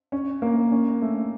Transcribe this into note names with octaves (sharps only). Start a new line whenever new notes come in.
C#4
A#3
C#4
A3